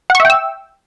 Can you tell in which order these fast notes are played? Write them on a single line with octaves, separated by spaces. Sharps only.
F#5 C#6 E5 G5 E6